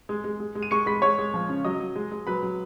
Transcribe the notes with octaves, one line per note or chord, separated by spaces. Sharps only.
G#3
G#3
G#3
G#3
D#7
G#3 C#6 C#7
G#3 B5 B6
G#3 C#5 C#6
G#3
F3
C#3
F#3 D#5 D#6
F#3
G#3
G#3
F#3 B4 B5
F#3